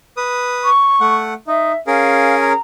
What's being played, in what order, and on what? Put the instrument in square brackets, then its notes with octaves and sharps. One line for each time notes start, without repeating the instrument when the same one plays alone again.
[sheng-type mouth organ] B4 D#6
[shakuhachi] C#6
[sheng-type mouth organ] A3 F#5
[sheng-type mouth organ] D#4 [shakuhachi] E5
[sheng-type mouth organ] C#4 G#4 A#4 [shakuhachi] F5
[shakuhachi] A#5